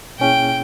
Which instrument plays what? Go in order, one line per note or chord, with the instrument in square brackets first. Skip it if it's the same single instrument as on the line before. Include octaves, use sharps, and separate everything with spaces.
[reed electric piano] B2 A#3 C#4 E4 G#4 [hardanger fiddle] G5